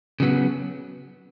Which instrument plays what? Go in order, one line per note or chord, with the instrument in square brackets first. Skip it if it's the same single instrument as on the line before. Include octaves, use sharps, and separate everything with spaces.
[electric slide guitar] C#3 F#3 B3